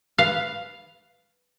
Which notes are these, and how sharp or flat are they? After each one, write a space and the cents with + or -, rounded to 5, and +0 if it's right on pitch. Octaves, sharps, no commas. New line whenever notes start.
B4 +0 F5 +0